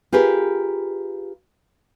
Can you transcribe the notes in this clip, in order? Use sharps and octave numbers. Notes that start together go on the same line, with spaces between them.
F4 G4 G#4 A#4 B4